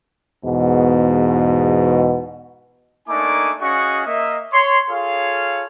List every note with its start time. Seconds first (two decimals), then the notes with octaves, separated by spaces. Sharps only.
0.44 E2 G#2 B2
3.08 A3 A#3 D4 D#4 G#5 D6
3.61 C#4 F#4 G#4 D#5 F5 C#6
4.06 A#3 D#5 E5
4.53 C#5 C6
4.90 F4 G#4 A4 C#5 F5